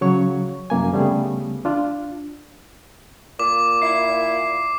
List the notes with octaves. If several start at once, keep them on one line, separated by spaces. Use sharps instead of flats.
C#3 F#3 C#5 C#6
C2 F#2 A#3 G#5
D2 C#3 G3 A3 B3 G#4
D4 F4
A#2 D6
E4 C7